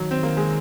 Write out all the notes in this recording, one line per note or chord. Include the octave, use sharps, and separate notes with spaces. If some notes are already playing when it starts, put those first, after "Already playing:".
Already playing: D#3 F#3
C4
A#3
G#3